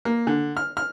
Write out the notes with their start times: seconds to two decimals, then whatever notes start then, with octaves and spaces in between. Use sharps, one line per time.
0.05 A#3
0.27 D3
0.57 F6
0.77 F6